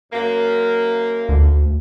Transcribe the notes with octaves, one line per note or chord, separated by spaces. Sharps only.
F#2 A#3
D2